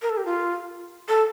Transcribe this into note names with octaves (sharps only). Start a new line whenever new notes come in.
A#4
A4
G4
F4
A4